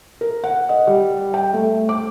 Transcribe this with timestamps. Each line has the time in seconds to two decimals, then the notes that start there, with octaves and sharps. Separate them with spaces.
0.21 A#4
0.44 F#5
0.69 D#5
0.87 G3
1.34 G5
1.53 A3
1.89 D6